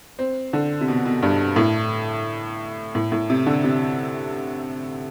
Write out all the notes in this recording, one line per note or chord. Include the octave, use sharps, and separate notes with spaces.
C4
D3
C3
B2
B2
G2
A2
A2
A2
C3
D3
C3